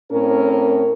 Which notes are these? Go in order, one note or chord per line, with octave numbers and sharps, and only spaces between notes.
A2 C4 C#4 A#4